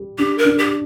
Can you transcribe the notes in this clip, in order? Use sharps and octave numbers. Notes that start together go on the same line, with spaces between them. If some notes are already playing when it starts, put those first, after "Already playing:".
Already playing: G3
D4 G4
A#4
D4
G4